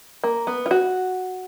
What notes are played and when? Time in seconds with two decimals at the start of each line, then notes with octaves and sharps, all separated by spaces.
0.24 A#3
0.47 B3
0.66 F4
0.71 F#4